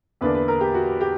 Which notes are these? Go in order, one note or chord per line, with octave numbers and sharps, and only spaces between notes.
E2 D3 A#3 D4 B4
B4
A#4
G4
F#4
G4